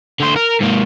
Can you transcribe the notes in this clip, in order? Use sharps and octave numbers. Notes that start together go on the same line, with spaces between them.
D3 C5
A#4
G#2 A#3